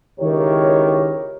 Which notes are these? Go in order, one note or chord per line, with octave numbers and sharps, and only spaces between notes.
C#2 D#3 E4 G4 A#4 C#5